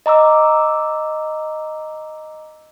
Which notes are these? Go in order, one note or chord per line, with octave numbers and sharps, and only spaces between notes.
D#5 A#5 D6 E6